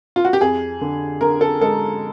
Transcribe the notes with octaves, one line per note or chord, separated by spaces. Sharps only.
F4
F#4
G4
F2 G#4
D3
D3 A#4
A4
G#3 A4